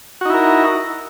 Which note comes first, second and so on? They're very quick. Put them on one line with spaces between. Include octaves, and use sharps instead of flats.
F#4 D#4 E4 A#4